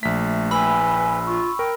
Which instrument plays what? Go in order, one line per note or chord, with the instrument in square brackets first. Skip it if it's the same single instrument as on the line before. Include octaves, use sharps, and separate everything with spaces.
[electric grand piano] A#1 B6 [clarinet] A3
[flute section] B4 G5 G#5 [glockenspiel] B5 E6
[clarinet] F4 [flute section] C#6
[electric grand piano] A#4 [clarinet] G5